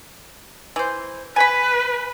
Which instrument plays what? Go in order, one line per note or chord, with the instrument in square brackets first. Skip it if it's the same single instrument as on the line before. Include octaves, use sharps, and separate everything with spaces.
[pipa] E3 C5
[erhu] B4 [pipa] G#5 B5